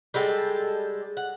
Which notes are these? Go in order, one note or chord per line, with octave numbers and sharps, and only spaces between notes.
G3 G#3 A4 G5
F#5